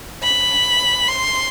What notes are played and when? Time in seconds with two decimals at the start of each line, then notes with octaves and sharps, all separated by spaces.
0.23 B5
1.08 C6